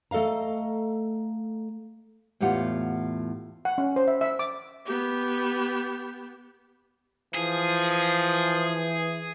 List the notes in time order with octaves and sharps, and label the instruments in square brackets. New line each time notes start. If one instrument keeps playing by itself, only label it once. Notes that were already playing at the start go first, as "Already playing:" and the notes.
[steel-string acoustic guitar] A3 A4 D#5 F5 A#5
[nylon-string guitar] E2 A2 F4 G4 F#5
[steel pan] F#5
C#4
C5
E5
E5
D6
[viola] B3 G4
[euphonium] E3 [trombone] F3 [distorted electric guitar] G#4